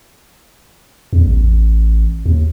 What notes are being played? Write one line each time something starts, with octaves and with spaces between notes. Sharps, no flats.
E2
A1
D#2